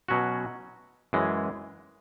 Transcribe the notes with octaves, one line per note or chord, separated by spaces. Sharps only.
B2 F#3 C#4 F#4
F#2 E3 G#3